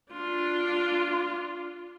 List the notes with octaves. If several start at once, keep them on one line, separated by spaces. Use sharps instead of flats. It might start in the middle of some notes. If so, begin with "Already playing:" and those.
D4 F4